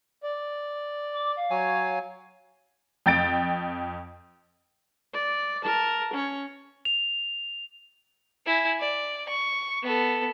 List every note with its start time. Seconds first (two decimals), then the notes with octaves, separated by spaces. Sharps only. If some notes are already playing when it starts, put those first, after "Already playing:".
0.23 D5
1.13 D6
1.36 F5
1.51 F#3 C#5 G#5
3.06 F2 G5 A6 D7
5.14 D5
5.63 A#4 A5
6.14 C#4 C#5
6.85 F7
8.46 E4 G#5
8.80 D5
9.29 C#6
9.82 B3 A4